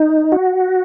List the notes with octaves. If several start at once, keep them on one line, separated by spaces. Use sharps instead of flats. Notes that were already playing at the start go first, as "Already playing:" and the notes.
Already playing: D#4
F#4